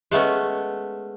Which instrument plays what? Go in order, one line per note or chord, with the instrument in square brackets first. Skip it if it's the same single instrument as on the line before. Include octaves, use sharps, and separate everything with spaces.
[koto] G#3 A3 B3 C#4